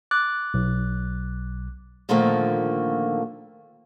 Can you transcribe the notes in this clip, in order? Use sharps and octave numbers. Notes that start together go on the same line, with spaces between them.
D6 F#6 A6
B1
A#2 D3 D#3 F3 A3 A#3